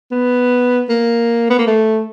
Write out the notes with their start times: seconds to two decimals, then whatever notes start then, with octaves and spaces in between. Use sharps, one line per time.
0.11 B3
0.89 A#3
1.50 B3
1.59 A#3
1.67 A3